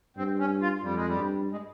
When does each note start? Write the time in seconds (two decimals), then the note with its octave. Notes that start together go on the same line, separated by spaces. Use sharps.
0.17 G2 C4
0.39 C#4
0.62 F4
0.83 F2 G3
0.95 G#3
1.07 G3
1.17 G2
1.52 G#3